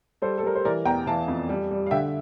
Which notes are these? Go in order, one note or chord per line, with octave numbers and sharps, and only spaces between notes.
G3 A4 C5
A4
G3 A#4
C5
E3 A#4 D5
E2 G5 A#5
E3 F5 A5
F2
G3
G3
F5
D3 E5 G5